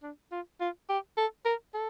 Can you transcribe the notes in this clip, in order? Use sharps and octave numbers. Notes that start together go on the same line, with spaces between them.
D4
F4
F4
G4
A4
A#4
A4